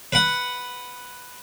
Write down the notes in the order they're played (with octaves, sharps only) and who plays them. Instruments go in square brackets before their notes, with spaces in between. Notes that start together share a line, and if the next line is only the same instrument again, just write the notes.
[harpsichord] B4 F#5